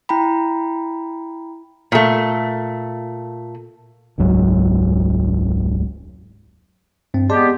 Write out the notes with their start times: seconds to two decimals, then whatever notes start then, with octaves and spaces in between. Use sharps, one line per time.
0.09 E4 G5 A#5 B5
1.92 A#2 A3
4.18 E1 C#2 G#2 F#3
7.14 G2 C4
7.30 G#3 B3 G4 D5 A5 C6